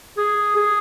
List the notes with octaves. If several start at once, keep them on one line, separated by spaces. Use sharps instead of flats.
G#4
G#4